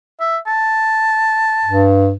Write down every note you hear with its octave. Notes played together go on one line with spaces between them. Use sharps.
E5
A5
G2